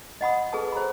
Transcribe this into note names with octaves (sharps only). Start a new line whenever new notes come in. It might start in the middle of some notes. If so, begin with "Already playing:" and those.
D#5 F#5 B5 D#6
G#4 A4 B4 A5 D#6
C5 A#5 B5